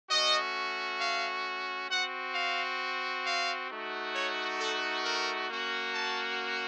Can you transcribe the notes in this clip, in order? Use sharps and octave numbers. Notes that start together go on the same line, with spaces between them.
A3 C#4 F#4 D#5
F5
C4 F#4 F#5
F5
F5
A3 D#4 F#4
C#5
A4
A#4
A#3 C#4 F#4
A5